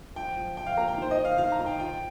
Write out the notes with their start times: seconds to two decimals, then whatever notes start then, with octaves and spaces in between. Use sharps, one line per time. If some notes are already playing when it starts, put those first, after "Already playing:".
0.15 F3 G5
0.36 F3
0.57 F3 G5
0.67 F5
0.77 A#3 A#5
0.88 G5
0.98 D#3 C5
1.11 D#5
1.18 D#4
1.25 F5
1.38 D#3 F5
1.52 A#5
1.60 D#3
1.66 G5
1.79 F4 G5